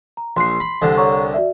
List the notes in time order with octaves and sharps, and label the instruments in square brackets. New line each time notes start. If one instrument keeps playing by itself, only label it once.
[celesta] A#5
[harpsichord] A#1 [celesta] C6 C7
[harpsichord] B5
C2 D3
[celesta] C#5 A#5 C#6
F#4 D5 E5